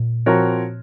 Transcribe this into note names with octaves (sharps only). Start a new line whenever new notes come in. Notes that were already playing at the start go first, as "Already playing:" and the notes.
Already playing: A#2
F3 C4 F#4 A#4 C#5